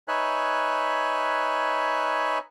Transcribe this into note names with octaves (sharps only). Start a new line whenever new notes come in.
D#4 B4 C#5 E5 G#5 F#6